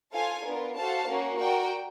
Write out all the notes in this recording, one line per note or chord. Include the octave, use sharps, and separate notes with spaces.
F4 A4 C5 F5 G#5
B3 D4 F4 A#4
F#4 A4 C5 F5 A5
A#3 C#4 F#4
F#4 A#4 D5 G5